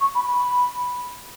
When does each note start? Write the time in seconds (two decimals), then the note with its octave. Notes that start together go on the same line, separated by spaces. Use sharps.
0.01 C#6
0.15 B5
0.29 B5